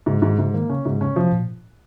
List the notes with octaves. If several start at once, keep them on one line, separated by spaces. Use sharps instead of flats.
G#2 C#3
G#2 D#3
G#2 C#3
D#3 A#3
C#3 C#4
G#2 C#3
C#3 C#4
C3 F3
A#2